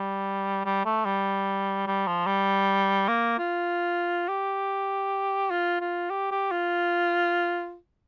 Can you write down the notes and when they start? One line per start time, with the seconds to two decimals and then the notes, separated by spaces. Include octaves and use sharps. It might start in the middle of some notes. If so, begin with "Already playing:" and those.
Already playing: G3
0.65 G3
0.85 A3
1.05 G3
1.87 G3
2.07 F3
2.26 G3
3.08 A#3
3.39 F4
4.28 G4
5.50 F4
5.81 F4
6.10 G4
6.31 G4
6.51 F4